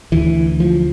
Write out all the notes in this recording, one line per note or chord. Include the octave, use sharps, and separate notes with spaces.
D2 D3 E3
F3